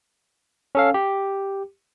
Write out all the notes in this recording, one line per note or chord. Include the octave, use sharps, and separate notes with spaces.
C#4 A4 F5
G4